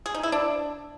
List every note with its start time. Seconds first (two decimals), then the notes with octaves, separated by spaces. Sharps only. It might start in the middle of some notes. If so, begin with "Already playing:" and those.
0.06 G#4
0.15 D#4
0.23 E4
0.32 D4